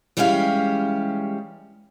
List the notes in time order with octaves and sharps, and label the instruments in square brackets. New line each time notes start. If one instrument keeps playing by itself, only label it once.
[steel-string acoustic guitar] E3 G3 G#3 C#4 G4 F5